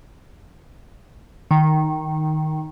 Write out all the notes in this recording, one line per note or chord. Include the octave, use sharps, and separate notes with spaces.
D#3